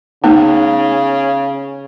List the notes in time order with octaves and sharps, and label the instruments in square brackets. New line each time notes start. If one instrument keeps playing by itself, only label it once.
[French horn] C#3 [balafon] A3 B3 D#4